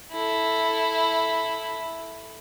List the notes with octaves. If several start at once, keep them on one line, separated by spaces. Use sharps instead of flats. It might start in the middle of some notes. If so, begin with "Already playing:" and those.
E4 A4